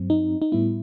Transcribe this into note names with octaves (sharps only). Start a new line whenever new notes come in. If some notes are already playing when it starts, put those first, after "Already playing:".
Already playing: G2 F#3 C4
D#4
D#4
A2 G3 B3 E4